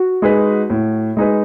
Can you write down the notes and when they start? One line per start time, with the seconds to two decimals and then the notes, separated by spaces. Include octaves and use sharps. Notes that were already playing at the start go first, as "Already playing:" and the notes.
Already playing: F#4
0.22 G#3 D#4 G#4 B4
0.70 A2
1.17 G#3 D#4 G#4 B4